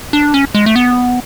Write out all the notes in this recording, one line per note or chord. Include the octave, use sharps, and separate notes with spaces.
D4
C#4
G#3
A3
B3